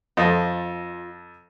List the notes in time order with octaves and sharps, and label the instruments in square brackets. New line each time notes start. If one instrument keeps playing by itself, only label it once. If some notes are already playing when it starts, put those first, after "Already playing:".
[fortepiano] F2 A4 [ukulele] F4 D#5